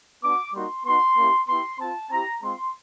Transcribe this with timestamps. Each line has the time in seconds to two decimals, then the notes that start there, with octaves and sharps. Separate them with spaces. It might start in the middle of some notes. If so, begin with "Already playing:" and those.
0.23 B3 D4 F#4 D6
0.54 G3 A#3 D#4 F#4 C6
0.86 B3 D#4 F#4 C6
1.18 A#3 C#4 E4 G4
1.49 B3 E4 G4 C6
1.80 C4 F4 A5
2.11 C4 E4 G4 A#5
2.43 G#3 C4 F4 C6